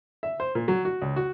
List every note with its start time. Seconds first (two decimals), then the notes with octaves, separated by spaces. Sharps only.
0.23 E5
0.40 C5
0.55 A#2
0.68 F#3
0.85 F#4
1.02 C#2
1.16 F#4